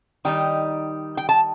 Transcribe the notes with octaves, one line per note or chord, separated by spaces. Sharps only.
D#3 G3 D#4 G5
G5
A5